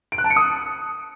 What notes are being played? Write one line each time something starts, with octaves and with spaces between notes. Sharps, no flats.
D7
F#6
A5
C#7
D#6